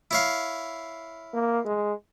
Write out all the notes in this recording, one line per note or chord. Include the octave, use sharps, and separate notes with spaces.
E4 C#5 F5
A#3
G#3